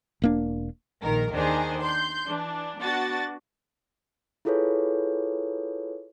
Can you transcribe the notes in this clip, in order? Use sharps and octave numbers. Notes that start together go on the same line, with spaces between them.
E1 A#3 D4
A#1 D#3 A#4
D#2 D#3 D4 G#4 C5
C6 G6
E3 D4
B3 D4 F#4 A6
E4 F4 G#4 A4 B4 C#5